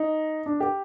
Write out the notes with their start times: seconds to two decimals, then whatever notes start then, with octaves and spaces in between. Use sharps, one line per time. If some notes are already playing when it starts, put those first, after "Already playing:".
Already playing: D#4
0.46 D4
0.61 G4